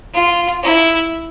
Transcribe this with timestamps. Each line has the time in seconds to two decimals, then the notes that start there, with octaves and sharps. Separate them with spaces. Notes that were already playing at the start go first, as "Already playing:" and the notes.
0.14 F4
0.63 E4